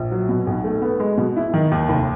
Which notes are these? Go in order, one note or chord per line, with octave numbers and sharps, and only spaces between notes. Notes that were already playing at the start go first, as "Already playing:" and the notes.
Already playing: A#1
F#3
B2
B1
A3
B3
G#3
B2
E4
D#3
D#2
F1